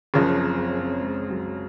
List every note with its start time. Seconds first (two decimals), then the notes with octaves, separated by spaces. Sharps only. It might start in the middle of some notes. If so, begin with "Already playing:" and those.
0.14 F#1 F#2 C#3 F3 C#4
0.35 C4
0.57 C4
0.79 C4
1.00 G#3
1.30 F#3